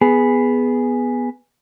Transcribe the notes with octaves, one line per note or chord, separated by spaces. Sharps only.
B3 G#4